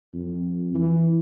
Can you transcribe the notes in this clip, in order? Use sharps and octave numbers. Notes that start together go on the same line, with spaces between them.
F2
E3